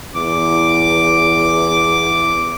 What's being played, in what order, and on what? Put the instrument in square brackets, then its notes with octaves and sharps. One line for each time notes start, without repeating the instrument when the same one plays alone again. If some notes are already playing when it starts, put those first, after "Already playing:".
[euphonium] E2 [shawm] D6